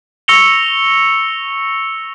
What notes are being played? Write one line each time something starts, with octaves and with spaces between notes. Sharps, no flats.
C#6 E6 A#6 C#7 F7 G7